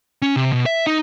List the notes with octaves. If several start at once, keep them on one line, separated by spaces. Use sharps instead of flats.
C#4
C3
B2
E5
D#4